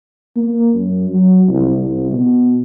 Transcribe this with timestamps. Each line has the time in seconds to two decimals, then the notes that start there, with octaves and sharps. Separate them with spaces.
0.36 A#3
0.74 F#2
1.09 F#3
1.48 C2
1.79 C2
2.12 B2